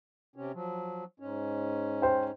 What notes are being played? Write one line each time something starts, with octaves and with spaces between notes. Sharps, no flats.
C3 C#4
F3 F#3
G#2 C#4
C5 G5